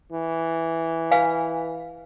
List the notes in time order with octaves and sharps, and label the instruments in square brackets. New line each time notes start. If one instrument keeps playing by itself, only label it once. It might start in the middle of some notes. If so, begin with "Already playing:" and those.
[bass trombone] E3
[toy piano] B4 F5 G#5